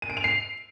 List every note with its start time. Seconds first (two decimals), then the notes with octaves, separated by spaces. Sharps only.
0.02 D#7
0.10 D7
0.17 F7
0.24 C7